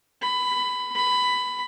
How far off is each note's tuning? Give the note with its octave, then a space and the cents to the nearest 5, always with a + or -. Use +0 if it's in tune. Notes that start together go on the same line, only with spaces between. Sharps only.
B5 +15
B5 +15